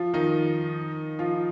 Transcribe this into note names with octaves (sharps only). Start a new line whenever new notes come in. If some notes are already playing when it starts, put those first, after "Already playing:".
Already playing: F3 F4
D#3 D#4
F3 F4